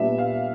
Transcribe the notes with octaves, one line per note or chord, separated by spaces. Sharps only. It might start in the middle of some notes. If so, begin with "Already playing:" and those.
Already playing: A#2 G3 B3 D4 E5
F5